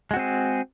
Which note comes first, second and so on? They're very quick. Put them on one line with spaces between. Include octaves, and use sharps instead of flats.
G#3 F#4 C4 G#4